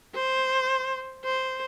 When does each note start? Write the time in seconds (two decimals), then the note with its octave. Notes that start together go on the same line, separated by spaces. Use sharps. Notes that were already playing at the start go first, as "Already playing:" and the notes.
0.15 C5
1.25 C5